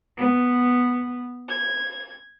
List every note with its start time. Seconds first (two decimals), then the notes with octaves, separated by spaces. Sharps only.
0.16 B3
1.48 G#6